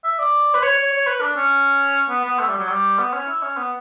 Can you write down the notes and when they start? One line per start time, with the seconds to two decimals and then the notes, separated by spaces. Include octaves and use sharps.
0.04 E5
0.19 D5
0.54 B4
0.63 C#5
0.78 C#5
0.92 C#5
1.07 B4
1.21 D4
1.37 C#4
2.09 B3
2.25 B3
2.39 A3
2.49 G3
2.59 F#3
2.69 G3
2.98 B3
3.13 C#4
3.28 E4
3.42 C#4
3.57 B3